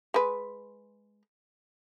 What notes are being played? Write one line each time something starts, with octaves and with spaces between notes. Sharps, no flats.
G#3 B4